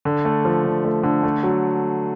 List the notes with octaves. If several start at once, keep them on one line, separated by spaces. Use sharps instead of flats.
D3
A3
F3
D3
A3
D3
A3
F#3